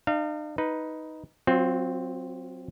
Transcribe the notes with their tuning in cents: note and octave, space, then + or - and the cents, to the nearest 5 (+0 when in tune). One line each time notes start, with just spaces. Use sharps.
D#4 -45 F5 -25
D#4 +10 B4 +0
F#3 +0 C4 +0 F4 +30